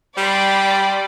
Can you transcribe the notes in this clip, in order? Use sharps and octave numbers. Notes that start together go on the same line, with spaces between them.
G3 D5 B5 C6